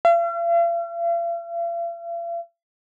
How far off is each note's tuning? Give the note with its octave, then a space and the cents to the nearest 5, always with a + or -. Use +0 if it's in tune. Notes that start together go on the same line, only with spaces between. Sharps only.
F5 -45